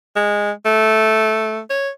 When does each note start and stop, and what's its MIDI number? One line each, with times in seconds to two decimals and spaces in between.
0.16 0.51 56
0.65 1.59 57
1.70 1.89 73